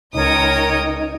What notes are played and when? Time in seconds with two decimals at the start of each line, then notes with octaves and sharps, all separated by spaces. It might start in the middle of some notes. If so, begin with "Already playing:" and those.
0.14 C#2 D#4 A#4 C#5 G5 D#6